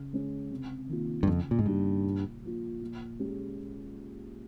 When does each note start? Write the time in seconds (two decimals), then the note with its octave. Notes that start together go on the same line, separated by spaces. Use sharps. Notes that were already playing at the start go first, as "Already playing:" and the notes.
Already playing: C#3
0.13 G#3 C#4
0.51 C3
0.89 D#3 A#3 F4
1.23 G2
1.27 F2 C#3
1.51 A#2
1.59 G#2
1.66 G2 G3 A#3 D#4
2.05 A#2
2.43 F3 A#3 F4
2.81 A#2
3.19 G#3 C#4 G4